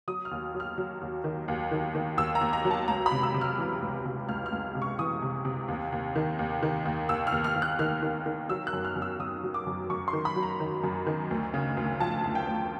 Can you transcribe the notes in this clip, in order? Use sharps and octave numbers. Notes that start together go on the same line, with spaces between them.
F#3 D#6
F6
D#2
F#3
F6
F#3
D#2
D#3
D#2
D#3
D#3
D#2 E6
A#5
D#2
A#5
F#3
A5
C#2 A#5
B5
C3
E6
C3
F6
E3
C#2
C3
C#2 F6
F6
C#2
C3
C#6
E3 D#6
C3
C3
D#2
D#2
D#3
D#2
D#3
D#2
D#2 E6
F6
D#2
F6
D#2
F#6
D#3 F6
D#3
D#3
F#3 E6
F#6
F#2
F6
F#2
E6
F#2 D#6
F#3
D6
F#2
F#2 C#6
C6
D#3
B5
F#3
A#5
D#3
F#2
D#3
D2
C#3
D2
F3 A5
D2
G5
D2